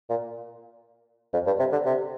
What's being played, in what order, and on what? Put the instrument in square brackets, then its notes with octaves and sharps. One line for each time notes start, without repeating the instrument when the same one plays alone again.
[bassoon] A#2
F2
G2
C3
D3
C3